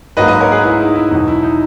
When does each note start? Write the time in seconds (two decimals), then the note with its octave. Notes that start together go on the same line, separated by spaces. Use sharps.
0.17 G#2 F#3 A#3 B4 D#5
0.28 B4 D#5
0.40 A#4 C#5
0.52 G#4 B4
0.64 E4 G#4
0.79 D#4
0.96 E4
1.11 E2 B2 F#3 D#4
1.28 E4
1.43 D#4